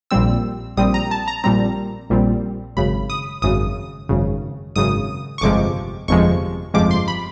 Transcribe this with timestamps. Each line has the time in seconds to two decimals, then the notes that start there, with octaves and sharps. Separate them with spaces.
0.11 A#1 A#2 G3 C4 E6
0.77 A#1 A#2 G3 C4 D#6
0.94 A#5
1.11 A5
1.28 A#5
1.44 A#1 A#2 G3 C4 A#5
2.10 A#1 A#2 G3 C4
2.77 G#1 F#2 C#3 B5
3.10 D#6
3.42 G#1 F#2 C#3 D#6
4.09 G#1 F#2 C#3
4.76 G#1 F#2 C#3 D#6
5.38 C#6
5.41 G1 F2 C3 F3 G#3 D6
6.08 G1 F2 C3 F3 G#3 C#6
6.74 G1 F2 C3 F3 G#3 D6
6.91 C6
7.08 B5